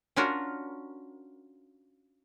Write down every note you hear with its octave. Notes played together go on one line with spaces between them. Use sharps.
C#4 D4 F4 F#4 A#4